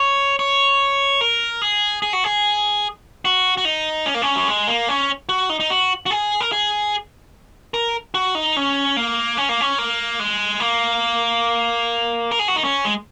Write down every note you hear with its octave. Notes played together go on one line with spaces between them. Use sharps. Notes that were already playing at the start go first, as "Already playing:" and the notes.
Already playing: C#5
C#5
A#4
G#4
G#4
F#4
G#4
F#4
F#4
D#4
C#4
A#3
C#4
F#3
G#3
A#3
C#4
F#4
D#4
D#4
F#4
F#4
G#4
A#4
G#4
A#4
F#4
D#4
C#4
A#3
C#4
A#3
C#4
A#3
G#3
A#3
A#4
G#4
F#4
D#4
C#4
G#3